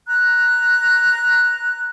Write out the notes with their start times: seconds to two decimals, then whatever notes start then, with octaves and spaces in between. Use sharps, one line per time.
0.06 A#5 F#6